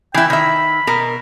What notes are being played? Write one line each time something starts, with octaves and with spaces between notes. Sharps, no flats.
E3 E4 G5
D#3 E5 B5
B2 A#4